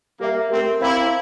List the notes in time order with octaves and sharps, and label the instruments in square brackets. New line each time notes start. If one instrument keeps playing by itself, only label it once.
[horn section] G3 A#3 [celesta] G4 A#4 E5
[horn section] A3 C4 [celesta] G4 A#4 E5
[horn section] C4 E4 [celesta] C5 F5 A#5 D6